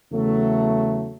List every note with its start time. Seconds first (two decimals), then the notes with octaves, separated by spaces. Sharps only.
0.11 E2 C#3 F#3 A3